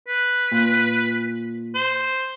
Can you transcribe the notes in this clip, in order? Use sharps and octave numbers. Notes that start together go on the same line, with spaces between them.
B4
A#2
C5